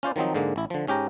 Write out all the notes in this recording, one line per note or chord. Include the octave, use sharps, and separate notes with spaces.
C#4 F4 C5 D5
D#3 F3 F#3 C4 D#4
G#2 D3 G#3 A#3
A1 E4
D3 F3
G#2 C#4 G4 G5 A#5